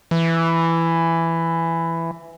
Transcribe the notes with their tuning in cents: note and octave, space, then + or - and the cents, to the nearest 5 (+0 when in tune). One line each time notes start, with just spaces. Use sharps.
E3 +10